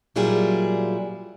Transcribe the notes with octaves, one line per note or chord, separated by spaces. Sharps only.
A#2 F#3 G3 E4 F4 G#4